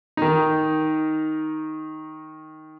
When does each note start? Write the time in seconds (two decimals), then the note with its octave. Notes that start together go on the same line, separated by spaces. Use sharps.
0.17 D#3 D#4